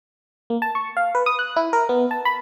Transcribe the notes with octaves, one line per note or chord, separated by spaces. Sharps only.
A#3
A5
C#6
F5
B4
D#6
F#6
E4
A#4
B3
A5
B5